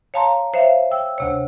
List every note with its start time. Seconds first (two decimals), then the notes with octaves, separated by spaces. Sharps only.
0.14 C#5 F5 A5 A#5 C6
0.54 C5 C#5 E5 F5
0.91 G5 E6
1.18 D2 C3 C#5